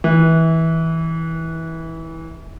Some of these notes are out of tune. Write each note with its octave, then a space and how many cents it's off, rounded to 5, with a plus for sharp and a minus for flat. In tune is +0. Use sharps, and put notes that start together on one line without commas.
E3 -20